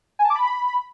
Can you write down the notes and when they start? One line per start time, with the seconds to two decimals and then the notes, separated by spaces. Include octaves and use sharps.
0.19 G#5
0.25 A5
0.30 D6
0.35 B5